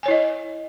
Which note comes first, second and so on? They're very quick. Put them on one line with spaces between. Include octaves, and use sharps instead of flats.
G#5 C#5 E4 D#5